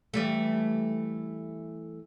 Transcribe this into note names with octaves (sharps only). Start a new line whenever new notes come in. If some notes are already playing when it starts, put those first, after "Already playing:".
E3 G3 A3